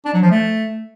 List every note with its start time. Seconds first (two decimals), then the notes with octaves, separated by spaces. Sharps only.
0.05 D4
0.14 F#3
0.22 F3
0.30 A3